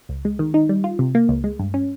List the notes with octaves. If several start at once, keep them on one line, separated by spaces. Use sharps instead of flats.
C#2
G#3
D#3
D#4
G3
F4
C3
A#3
C#2
G#3
G2
C#4